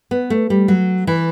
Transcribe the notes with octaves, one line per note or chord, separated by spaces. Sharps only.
B3
A3
G3
F#3
E3